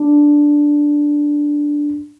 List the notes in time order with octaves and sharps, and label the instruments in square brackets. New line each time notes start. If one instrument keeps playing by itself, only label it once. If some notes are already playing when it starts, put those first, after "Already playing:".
Already playing: [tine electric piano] D4